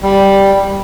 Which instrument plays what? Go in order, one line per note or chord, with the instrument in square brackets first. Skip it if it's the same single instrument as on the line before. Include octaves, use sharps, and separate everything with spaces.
[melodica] G3